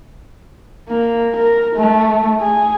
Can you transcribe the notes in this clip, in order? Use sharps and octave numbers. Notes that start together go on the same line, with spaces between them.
A#3
A#4
A3
G#4